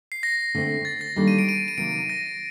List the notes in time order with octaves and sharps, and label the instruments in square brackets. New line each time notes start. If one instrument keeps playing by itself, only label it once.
[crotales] C7
A#6
[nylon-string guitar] D3 A3 C4
[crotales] A6
A#6
[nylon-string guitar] D#3 G3 A#3 D4 A4
[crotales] D#7
D7
D#7
D#7
[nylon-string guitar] C3 D#3 F#3 A#3 [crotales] D7
[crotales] A#6